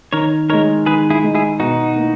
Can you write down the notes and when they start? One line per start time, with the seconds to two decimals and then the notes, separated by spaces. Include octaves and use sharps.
0.13 D#3 A#4 C#5
0.50 G#3 D#4 A#4 C#5
0.86 D#3 G#4 B4
1.10 E4 G#4
1.23 G#3 D#4
1.35 E4 G#4
1.59 B2 D#4 F#4
1.96 A#3 E4